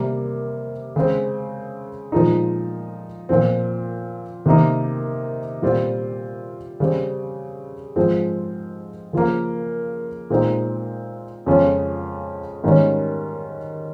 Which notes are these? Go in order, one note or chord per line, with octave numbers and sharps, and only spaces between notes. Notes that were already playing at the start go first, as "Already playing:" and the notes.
Already playing: C3 G3 A#3
C#3 G#3 C4
A#2 F3 G#3 D#4
A#2 F3 C4
C3 D#3 A#3 D#4
A#2 G3 C4 F4
C#3 G3 C4
G#2 F3 G#3 C4
C#3 F3 A#3
A#2 G#3 C4 D#4
F2 C#3 G#3 C#4 F4
G#2 D#3 G3 C#4